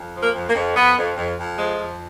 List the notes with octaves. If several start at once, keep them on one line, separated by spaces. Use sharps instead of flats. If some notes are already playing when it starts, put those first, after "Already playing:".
Already playing: F2
F3
A#3
F2
A#3
F2
F2 B3
F2
F2
F2
F3 G#3
F2